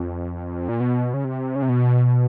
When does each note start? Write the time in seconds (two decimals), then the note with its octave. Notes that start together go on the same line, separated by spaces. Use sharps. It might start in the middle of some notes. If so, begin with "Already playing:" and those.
Already playing: F2
0.69 A#2
0.80 B2
1.14 C#3
1.24 C3
1.55 C#3
1.62 C3
1.69 B2